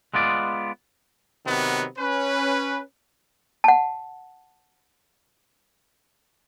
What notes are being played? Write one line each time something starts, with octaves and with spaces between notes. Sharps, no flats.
G#3 B3 F4 D5
C3 D#3 F#3 B3
C#4 B4
F#5 A5